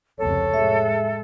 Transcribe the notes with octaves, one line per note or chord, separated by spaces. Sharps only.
F1 C#2 C3 A4 C#5
A2 G#3 E5